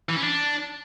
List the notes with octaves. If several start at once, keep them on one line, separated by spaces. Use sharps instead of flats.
E3
C#4
D4